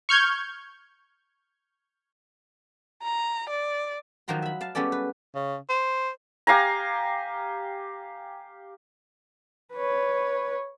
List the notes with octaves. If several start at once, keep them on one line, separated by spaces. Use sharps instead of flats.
C#6 F6 G6 G#6
A#5
D5
D#3 F3 F#3 A#5 C6
E5 B5
F5 A5
G3 G#3 B3 C#4 A4 D5
B4
C#3
C5
G4 F5 G#5 A#5
B4 C#5